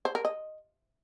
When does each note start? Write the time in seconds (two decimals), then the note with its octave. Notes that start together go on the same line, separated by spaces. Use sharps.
0.05 C5
0.15 A#4
0.25 D#5